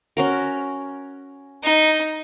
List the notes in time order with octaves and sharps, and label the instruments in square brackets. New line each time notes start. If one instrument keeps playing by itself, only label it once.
[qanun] C#4 F#4 A#4
[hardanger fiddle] D#4